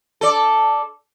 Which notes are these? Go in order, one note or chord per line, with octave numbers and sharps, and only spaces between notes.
A4 D5